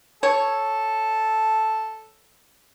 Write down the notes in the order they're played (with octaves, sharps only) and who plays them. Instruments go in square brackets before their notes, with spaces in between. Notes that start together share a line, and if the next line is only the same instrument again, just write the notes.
[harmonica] A4 [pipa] C#5